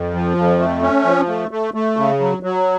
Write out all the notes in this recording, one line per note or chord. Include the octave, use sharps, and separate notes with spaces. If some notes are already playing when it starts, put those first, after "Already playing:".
Already playing: F2
F3
F2
A3
C#4
F3
A3
A3
A3
C#3
F#3
F#3